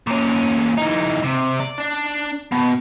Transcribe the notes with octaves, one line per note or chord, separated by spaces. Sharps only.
A#2 C#4
E3 D#4
C3
D5
D4
B2